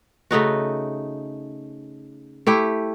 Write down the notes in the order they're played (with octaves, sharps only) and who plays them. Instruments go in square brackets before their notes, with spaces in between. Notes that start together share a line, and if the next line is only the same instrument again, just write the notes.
[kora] C#3 A3 D#4 F#4
A3 E4 G4